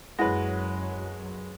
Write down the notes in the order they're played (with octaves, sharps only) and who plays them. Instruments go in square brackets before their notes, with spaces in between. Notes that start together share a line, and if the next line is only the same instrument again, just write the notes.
[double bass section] F#2 F#3 [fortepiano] G#3 B4 [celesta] E4 F#5 A#6